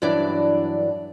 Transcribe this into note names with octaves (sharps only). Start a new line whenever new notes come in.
G2 E3 F#3 D4 E4 D5